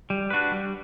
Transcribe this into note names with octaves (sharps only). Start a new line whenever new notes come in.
G3
D4 F#4 B4
G3